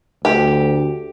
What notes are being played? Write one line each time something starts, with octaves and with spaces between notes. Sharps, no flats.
D2 G4